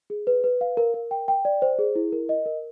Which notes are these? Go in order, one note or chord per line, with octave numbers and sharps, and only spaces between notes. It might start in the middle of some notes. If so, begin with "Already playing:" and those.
G#4
B4
B4
F5
A#4
A#4
G5
G5
D5
C5
G#4
E4
A#4
D#5
A#4